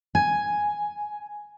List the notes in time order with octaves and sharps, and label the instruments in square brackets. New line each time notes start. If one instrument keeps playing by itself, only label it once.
[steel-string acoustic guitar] G#5